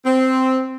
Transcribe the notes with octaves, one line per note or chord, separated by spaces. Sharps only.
C4